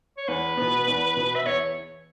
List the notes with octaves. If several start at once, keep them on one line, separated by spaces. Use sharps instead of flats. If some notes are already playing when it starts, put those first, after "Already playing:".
C#5
E2 B4
B2 B3
E2
B2 B3
E5
E2 C#5